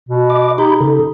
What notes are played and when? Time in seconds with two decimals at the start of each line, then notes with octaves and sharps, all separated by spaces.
0.09 B2
0.30 D#5 D6
0.58 D#4 G4 B5 G6
0.81 C#3 A4